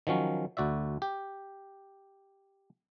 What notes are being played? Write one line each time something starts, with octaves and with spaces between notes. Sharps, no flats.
D#3 F3 F#3 C#4
D2 F#4 D5 E5
G4